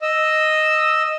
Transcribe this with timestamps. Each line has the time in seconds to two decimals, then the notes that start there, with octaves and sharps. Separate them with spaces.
0.02 D#5 E6